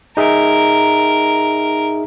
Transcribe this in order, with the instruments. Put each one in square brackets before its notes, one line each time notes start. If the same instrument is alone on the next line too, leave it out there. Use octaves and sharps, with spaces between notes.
[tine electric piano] D#4 G#4 E5 [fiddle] A#4